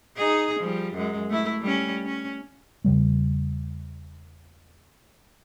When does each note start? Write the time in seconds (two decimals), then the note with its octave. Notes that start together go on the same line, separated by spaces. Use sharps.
0.16 D#4 G#4
0.60 F3 G3
0.94 F#2 G#3
1.30 A3 E4
1.62 G3 C#4
2.06 C#4
2.85 E2 C#3 G3 A3